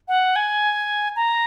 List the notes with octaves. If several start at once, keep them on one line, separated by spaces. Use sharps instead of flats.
F#5
G#5
A#5